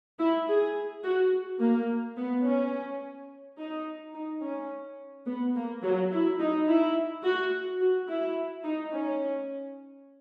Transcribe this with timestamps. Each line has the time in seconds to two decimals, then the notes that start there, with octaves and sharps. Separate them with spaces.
0.19 E4
0.48 G#4
1.04 F#4
1.60 A#3
2.17 B3
2.45 C#4
3.59 D#4
4.14 D#4
4.42 C#4
5.27 B3
5.56 A#3
5.83 F#3
6.12 E4
6.39 D#4
6.68 E4
7.24 F#4
7.81 F#4
8.08 E4
8.64 D#4
8.93 C#4